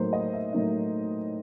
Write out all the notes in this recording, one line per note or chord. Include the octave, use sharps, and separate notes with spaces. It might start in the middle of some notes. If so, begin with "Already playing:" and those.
Already playing: A2 F#3 A#3 D#4 C5
D#5
E5
A2 F#3 A#3 D#4